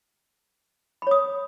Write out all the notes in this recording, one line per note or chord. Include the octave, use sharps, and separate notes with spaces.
C#5 B5 D#6